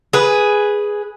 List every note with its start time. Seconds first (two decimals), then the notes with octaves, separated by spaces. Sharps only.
0.13 G#4 B4